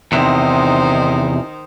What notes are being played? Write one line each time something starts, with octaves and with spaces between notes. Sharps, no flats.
E2 C3 D#3 D#4 C5